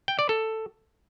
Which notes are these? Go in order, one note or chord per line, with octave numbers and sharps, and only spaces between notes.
G5
D5
A4